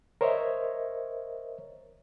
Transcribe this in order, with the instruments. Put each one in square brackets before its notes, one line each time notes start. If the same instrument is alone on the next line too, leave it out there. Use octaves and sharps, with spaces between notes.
[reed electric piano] A#4 C5 C#5 D#5 E5